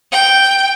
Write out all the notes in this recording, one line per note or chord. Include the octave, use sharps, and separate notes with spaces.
G5